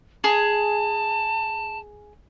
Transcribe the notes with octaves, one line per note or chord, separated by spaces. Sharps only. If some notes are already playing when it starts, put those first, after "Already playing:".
G#4 A5